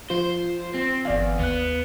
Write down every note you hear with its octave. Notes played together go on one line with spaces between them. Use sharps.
F3 F4 C5
C4
G1 E2 D5 F5
D#2 B3 F#6